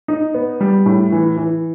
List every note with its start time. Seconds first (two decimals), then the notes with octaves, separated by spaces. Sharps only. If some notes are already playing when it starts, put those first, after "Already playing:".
0.08 D#4
0.34 B3
0.61 G3
0.86 A2
1.12 E3
1.37 E3